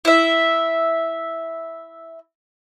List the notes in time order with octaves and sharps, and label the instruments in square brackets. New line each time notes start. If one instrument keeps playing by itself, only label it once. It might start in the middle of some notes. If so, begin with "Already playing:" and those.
[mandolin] E4 E5